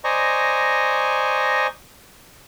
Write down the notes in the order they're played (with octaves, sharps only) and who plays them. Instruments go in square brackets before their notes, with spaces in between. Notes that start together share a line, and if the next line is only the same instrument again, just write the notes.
[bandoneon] C5 D5 D#5 G#5 A#5 C#6